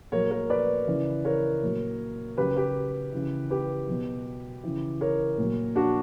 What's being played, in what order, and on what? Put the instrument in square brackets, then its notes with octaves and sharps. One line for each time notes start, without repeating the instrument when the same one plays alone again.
[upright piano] A#2 F#3 A#4 C#5
A#4 C#5
B4 D5
C#3 E3
A#4 C#5
A#2 F#3
C#3 F#3 G4 B4
G4 B4
C#3 E3
G4 B4
B2 F#3
C#3 E3
A#4 C#5
A#2
F#3
D4 F#4